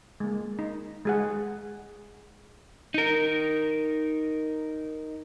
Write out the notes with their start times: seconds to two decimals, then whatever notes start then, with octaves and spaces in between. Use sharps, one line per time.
0.20 G#3 A#3
0.59 D#4
1.05 G#3 G#4 F#5
2.94 D#4 A#4